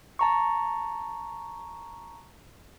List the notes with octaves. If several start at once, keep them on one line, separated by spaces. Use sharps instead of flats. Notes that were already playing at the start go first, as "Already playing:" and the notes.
A5 A#5 C#6